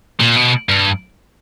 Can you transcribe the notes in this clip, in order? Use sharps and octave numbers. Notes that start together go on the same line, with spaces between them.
A#2
B2
G2